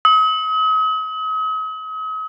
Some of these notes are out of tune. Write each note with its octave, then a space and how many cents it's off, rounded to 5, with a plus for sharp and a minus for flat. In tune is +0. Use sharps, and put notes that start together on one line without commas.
D#6 +40